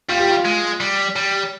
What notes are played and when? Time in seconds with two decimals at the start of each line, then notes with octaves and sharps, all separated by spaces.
0.09 G3 F4
0.20 G4
0.31 F4
0.45 G#3
0.80 G3
1.16 G3